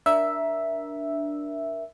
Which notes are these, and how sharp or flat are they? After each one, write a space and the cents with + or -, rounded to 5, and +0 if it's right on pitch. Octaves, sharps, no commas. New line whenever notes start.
D4 +0 A#4 +20 E5 +0